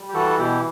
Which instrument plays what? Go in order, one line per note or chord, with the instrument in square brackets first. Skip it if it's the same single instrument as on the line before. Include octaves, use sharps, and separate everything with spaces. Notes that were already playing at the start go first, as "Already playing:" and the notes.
Already playing: [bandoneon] G3
G4
E3 F#4 A4
B2 E4 G4